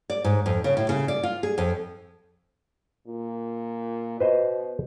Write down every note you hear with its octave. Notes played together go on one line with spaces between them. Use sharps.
D5
G#2
F2
C#3
A2
C#3
D5
F4
G#4
F2
A#2
B2 B4 C5 D#5